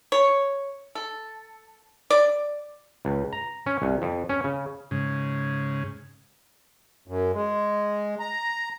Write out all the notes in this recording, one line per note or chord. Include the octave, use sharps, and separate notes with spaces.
C#5
A4
D5
C#2
A#5
C#4
C2
F2
C#4
C#3
G#2 C#3
F#2
G#3
A#5